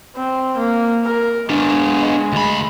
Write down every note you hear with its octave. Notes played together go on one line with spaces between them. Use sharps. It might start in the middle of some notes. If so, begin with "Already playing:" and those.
C4
A#3
A#4
G#3 B3 D4
D2 B5